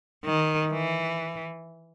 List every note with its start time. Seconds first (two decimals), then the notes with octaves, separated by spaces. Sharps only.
0.25 D#3
0.72 E3